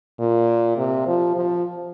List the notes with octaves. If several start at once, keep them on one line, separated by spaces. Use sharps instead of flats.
A#2
C3
F3
F3